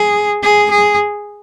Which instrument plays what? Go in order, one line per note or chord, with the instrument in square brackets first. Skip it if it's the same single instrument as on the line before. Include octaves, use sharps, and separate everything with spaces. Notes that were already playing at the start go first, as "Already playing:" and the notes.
Already playing: [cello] G#4
G#4
G#4